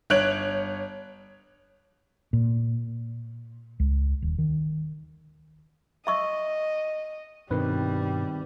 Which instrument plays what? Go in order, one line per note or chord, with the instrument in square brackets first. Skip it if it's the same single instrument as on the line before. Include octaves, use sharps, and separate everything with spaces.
[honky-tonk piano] G1 C#5 F#6 G#6 D7 F#7
[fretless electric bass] A#2
C#2
D#1
D#3
[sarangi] D#5 [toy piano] E5 C#6 E6
[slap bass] G2 B2 [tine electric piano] D#3 C4 B4 [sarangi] G3